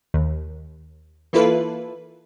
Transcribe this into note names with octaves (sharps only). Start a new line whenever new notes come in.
D#2
E3 A#3 E4 F4 A4 B4